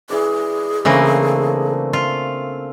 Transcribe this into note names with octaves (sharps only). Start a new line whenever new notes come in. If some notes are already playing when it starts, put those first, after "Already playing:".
E3 G#4 D5
C#3 E3 A3 A#3 C4 D4
F4